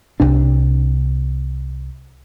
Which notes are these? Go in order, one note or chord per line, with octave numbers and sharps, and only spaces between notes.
C2 C3 D4